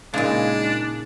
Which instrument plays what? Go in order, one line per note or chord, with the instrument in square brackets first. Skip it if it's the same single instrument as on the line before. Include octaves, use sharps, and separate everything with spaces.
[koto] A#2 C#3 [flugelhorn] G#3 [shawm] D4 [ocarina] D#4